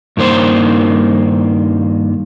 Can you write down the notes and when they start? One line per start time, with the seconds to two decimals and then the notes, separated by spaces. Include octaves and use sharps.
0.17 G2 D#3 A#3 C5